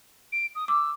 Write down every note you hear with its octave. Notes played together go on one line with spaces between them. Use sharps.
D7
D#6
D6 E6